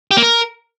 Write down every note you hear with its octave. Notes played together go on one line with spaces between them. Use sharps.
G4
A#3
A#4